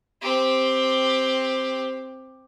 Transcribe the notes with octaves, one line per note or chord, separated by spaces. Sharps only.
C4 G4